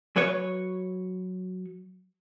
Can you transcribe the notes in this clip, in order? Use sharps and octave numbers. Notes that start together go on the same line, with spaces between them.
F#3 B4 C#5